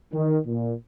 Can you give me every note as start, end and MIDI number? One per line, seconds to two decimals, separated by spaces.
0.12 0.38 51
0.46 0.72 46